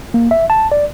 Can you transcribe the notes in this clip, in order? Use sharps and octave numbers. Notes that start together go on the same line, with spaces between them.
A#3
E5
A5
D5